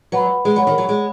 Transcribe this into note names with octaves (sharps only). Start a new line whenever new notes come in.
F#3 B4 F#5 B5
G#3
F#3 C#5 F#5 B5
D#3
F#3
G#3